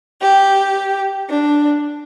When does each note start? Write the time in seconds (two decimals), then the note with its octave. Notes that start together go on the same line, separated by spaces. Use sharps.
0.21 G4
1.29 D4